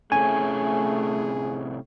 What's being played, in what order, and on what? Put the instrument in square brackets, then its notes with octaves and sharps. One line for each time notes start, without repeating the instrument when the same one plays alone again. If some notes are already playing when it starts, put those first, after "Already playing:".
[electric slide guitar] A2 C3 C#4 [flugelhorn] A3 [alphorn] G#4 [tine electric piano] G#5